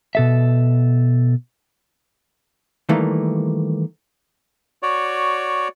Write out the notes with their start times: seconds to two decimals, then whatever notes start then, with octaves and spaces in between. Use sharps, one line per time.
0.15 B2 A4 E5
2.89 D#3 E3 G3 A3 A#3
4.83 F#4 C#5 D5